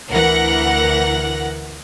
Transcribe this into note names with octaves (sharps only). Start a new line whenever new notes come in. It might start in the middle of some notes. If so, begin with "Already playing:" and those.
D2 E3 A#4 F#5 A#6